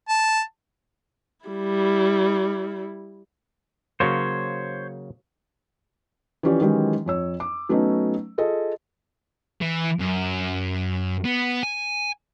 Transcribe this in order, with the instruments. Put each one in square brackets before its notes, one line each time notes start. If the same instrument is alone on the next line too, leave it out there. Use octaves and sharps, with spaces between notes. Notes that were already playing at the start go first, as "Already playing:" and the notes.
[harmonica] A5
[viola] G3 E4
[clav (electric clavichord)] C#3 F#3 A#3 [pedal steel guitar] C5 C#5
[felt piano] E3 F3 C#4 G4 D5
D#3 E3 F#3 G#3 C#4 G4
F2 C#5 E6
D6
F#3 A3 B3 C#4 D#4
F4 G#4 A4 D#5
[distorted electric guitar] E3
F#2
B3
G#5